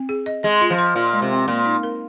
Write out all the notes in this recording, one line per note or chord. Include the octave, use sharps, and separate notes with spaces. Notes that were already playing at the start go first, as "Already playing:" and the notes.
Already playing: C4
G#4
D#5
G#3 D#5
F4
F3
C5
A#2 F4
G#3
C3
C4
A#2 A#3
D#4
A#4